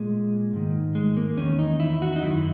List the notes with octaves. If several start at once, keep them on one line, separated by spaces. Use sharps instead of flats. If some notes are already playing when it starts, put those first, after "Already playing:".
Already playing: A#2 G#3
G#2 D#3
G#3
A#3
E2 D#3 C#4
D#4
E4
F#4
D#4
F#2 D#3 E4